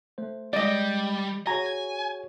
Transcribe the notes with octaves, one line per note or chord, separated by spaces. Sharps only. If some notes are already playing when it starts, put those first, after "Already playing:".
A3 C5
G3 G#3 D5 D#5
F#4 G#4 C#5 G#5 A#5